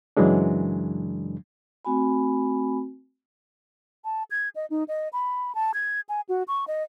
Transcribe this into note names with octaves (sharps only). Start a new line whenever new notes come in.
F#2 C#3 E3 F#3 G#3 D4
A3 C4 F#4 G#5 B5
A5
G#6
D#5
D#4
D#5
B5
A5
G#6
G#5
F#4
C#6
D#5